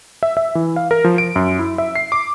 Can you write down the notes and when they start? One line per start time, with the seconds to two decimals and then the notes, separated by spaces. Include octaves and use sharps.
0.23 E5
0.37 E5
0.55 E3
0.76 F5
0.91 A#4
1.04 F3
1.18 D7
1.36 F#2
1.59 E4
1.78 E5
1.95 C7
2.12 D6